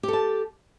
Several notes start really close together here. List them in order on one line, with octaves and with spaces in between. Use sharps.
G4 A4 A5